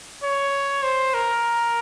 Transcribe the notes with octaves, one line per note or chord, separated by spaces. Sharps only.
C#5
C5
A#4